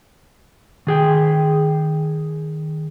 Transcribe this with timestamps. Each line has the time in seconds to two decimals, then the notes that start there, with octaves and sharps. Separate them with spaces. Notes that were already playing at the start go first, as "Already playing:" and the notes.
0.87 D#3 G#4 G5